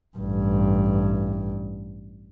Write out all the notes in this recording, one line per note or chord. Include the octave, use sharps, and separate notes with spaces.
A1 G2